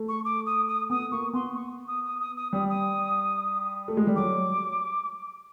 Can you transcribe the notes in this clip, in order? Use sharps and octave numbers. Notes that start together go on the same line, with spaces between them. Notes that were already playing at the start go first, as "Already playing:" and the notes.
Already playing: A3
C#6
D6
D#6
D#6
B3 D#6
A#3 C#6
B3 C6
C#6
D#6
D#6
D#6
D#6
G3 D#6
D#6
A3
G#3
G3
F#3 D6